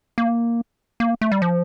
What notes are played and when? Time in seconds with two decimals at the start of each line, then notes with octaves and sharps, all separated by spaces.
0.18 A#3
1.00 A#3
1.21 A3
1.32 G3
1.42 F3